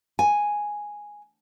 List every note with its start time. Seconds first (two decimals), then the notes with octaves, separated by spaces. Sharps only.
0.19 G#5